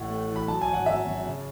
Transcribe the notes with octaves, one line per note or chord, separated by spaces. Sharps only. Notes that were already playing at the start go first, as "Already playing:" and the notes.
Already playing: A1 A2 F#5
A3
E3
B5
F#3 A5
G#5
G#1
F#5
F#2 E5
F#2
C#3